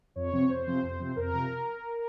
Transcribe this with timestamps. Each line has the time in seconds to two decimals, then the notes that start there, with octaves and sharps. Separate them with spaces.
0.16 F2 C#5
0.32 C3 F3 C4
0.49 F2 C5
0.66 C3 F3 C4
0.83 F2
0.99 C3 F3 C4
1.16 F2 A#4
1.33 C3 F3